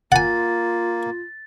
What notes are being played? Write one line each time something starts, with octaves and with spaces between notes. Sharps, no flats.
A#3 F4 F#5 G#5 A6